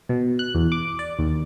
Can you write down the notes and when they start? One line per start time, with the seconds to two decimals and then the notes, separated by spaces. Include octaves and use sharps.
0.09 B2
0.39 F#6
0.55 E2
0.72 D6
0.99 D5
1.19 D#2